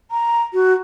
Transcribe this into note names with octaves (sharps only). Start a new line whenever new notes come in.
A#5
F#4